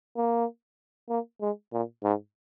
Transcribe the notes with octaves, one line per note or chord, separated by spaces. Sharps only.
A#3
A#3
G#3
A#2
G#2